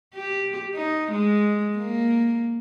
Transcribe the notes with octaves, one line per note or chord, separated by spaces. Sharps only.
G4
D#4
G#3
A#3